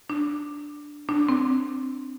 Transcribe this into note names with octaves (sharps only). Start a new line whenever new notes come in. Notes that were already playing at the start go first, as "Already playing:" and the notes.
D4
D4
C4